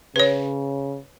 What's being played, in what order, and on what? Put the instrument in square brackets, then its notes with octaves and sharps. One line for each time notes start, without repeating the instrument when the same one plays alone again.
[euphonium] C#3 [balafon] B4 C#5